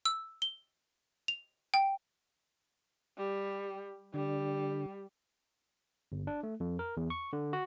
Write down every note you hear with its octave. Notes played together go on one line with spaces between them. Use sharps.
E6
G7
F7
G5
G3
D3 G3
G1
D4
A3
F2
A#4
E2
C#6
D3
F#4